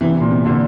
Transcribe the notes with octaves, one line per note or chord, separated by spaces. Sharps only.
C3 E3
C3
A#2
C3
A#2 D3